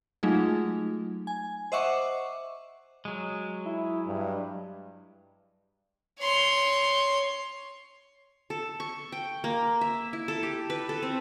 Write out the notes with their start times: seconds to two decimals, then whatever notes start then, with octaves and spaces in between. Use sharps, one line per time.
0.23 F#3 G#3 A3 D#4 F4 G#4
1.27 G#5
1.72 C5 D#5 E5 F#5 C#6 D6
3.05 F#3 G#3
3.66 E4
4.07 G2
6.20 C#5 C6
8.50 A4
8.80 C#6
9.12 G5
9.44 A#3
9.81 E5
10.13 E4
10.28 A4
10.43 G4
10.70 B4
10.89 A4
11.03 C4